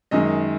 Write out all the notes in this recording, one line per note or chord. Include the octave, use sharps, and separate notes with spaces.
F#2 D#3 G#3 D#5